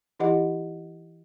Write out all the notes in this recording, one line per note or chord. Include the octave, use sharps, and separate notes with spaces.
E3 E4 G4 D#5 F#5